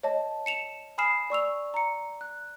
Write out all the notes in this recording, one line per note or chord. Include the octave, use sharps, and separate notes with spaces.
C#5 D#5 A5
C#7 E7 F7
G#5 B5 D#6 F6 C7 E7
D5 C#6 E6 F7
A#5 C#7
F#6